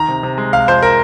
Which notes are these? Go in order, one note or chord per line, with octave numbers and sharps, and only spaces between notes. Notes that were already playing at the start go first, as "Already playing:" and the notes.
Already playing: D#3 A#5
C3
C3
G#3
C3 F5
F2 C5
A#4